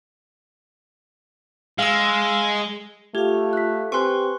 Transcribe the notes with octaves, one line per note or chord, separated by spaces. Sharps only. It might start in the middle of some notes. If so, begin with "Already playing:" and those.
G#3 F5 E6
A3 F4 G4 F5 G#6
F#6 B6
C4 G4 B4 C5 G#5 C6 C#6 F#6